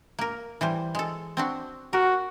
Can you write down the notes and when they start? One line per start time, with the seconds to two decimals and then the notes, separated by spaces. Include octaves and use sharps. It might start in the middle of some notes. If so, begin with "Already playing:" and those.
0.19 A#3 A#4
0.61 E3 G3 C5
0.95 G#3 A4
1.37 C4 D4 F#4
1.93 F#4 A#4